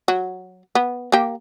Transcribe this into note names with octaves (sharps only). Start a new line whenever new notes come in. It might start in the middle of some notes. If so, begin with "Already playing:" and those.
F#3
B3
A#3 G4